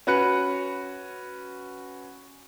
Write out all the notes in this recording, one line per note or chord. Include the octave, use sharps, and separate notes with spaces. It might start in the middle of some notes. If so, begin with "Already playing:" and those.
C#4 F#4 B4 F#6 C#7